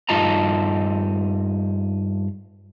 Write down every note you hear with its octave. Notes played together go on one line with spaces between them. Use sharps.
G2 D#4 F4 D#5 A5 A#5